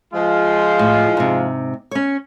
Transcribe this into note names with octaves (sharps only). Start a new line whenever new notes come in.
F3 G#3 F4
A2
G#2 C3
C#4 C#5